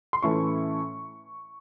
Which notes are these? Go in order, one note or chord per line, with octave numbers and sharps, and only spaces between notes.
C6
A2 E3 A3 C#4 E4 C#6